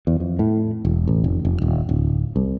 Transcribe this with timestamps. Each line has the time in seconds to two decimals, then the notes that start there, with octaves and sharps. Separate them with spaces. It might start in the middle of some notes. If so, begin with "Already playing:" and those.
0.07 E2
0.20 F2
0.39 A2
0.85 E1
1.07 A1
1.24 F1
1.45 F1
1.62 D#1
1.89 D1
2.36 C2